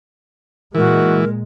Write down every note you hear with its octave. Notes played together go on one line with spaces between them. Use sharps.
A#2 E3 G#3 F#4 A#4